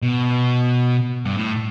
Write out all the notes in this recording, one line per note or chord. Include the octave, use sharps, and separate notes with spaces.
B2
G2
A2